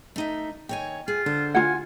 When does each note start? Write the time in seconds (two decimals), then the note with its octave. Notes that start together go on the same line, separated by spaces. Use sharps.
0.16 A3 D#4 E5
0.69 D#2 C#5 G5 G#5
1.08 F4 G#4
1.26 D3 C5
1.55 F4 F#5 G#5